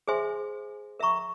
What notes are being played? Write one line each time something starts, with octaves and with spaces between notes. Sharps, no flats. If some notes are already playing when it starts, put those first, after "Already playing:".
G#4 C5 E5 G#5 C6
A#4 E5 A#5 C#6